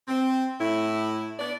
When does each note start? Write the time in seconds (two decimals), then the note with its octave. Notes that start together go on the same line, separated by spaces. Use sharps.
0.08 C4
0.60 A2 E4
1.39 B3 D4 D5